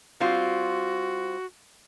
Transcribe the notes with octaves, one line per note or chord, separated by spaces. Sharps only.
G3 C4 F4 F#4